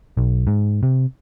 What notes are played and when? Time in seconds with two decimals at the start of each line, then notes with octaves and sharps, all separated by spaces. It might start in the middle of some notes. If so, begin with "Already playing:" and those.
0.17 B1
0.47 G#2
0.83 C3